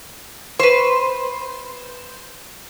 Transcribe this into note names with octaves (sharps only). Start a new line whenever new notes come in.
B4 C5 C#6